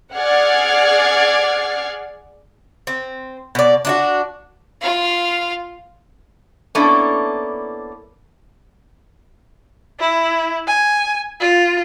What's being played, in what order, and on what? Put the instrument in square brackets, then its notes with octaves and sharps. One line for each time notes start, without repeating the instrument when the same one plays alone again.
[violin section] G#4 D5 F#5 F6 G#6 C7
[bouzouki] C4
B2 D5
D4 F4 F#4
[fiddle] F4 F5
[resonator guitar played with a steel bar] A#3 B3 C#4 D4 E4 A4
[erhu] E4
G#5
F4